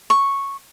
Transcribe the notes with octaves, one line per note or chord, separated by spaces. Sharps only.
C#6